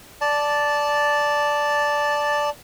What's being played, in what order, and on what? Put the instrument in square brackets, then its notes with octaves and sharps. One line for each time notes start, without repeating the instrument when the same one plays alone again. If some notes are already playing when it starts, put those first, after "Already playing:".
[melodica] D5 A5